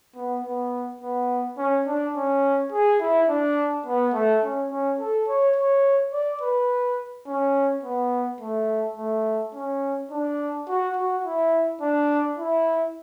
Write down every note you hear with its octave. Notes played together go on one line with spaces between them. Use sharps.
B3
B3
B3
C#4
D4
C#4
G#4
E4
D4
B3
A3
C#4
C#4
A4
C#5
C#5
D5
B4
C#4
B3
A3
A3
C#4
D4
F#4
F#4
E4
D4
E4